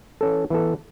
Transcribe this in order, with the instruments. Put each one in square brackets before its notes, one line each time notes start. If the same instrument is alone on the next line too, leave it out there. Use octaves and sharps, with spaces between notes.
[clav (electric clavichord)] E3 C#4 A4
E3 B3 A4